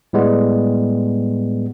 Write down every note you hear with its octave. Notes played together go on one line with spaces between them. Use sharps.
A2 G3 G#3 B3